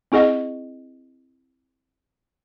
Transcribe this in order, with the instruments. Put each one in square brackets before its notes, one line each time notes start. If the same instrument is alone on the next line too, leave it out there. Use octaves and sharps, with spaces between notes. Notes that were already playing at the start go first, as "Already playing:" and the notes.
[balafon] C4 E4 G#4 D#5 F#5